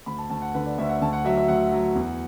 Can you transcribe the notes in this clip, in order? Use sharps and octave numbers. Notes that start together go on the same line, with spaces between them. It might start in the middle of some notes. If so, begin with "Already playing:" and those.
D2 B5
A5
D2 A5
F#5
D3 B4
D5
D2 E5
F#5
D2 A5
F#5
F#3 E5
E5
D2 F#5
F#3
E2